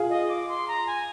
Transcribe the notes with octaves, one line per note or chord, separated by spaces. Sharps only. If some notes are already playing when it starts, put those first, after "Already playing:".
Already playing: F4 G#4
D#5
D6
C6
A#5
G#5